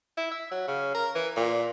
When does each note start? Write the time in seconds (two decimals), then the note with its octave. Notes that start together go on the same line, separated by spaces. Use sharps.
0.17 E4
0.32 E5
0.51 F#3
0.68 C#3
0.95 A#4
1.15 E3
1.37 A#2